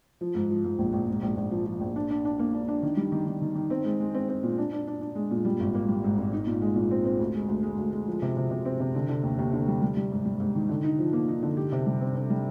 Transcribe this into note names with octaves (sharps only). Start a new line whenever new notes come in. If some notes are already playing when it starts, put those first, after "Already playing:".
F3
G#2
F3
G#2
A#1
A#1
G#2
A#1
A#1
F3
F3
A#1
D4
D4
D4
A#3
D4
D4
D#3
G3
D#3
D#3
D#3
D#3
C4
G#3
G#3
C4
C4
A#2
D4
D4
D4
D4
G#3
A#2
G3
G#1
A#3
G3
G#2
G#1
D#4
A#2
G#3
A#2
C4
C4
D2
G#3
D2
G#3
D2
G#3
F3
C3
C3
C3
C4
C3
D3
D3
D#2
D#2
D3
G3
G3
G3
G#2
G3
G#2
D#3
D3
D#4
F3
A#3
D#4
D3
G4
C3
G3
C4
C4
G3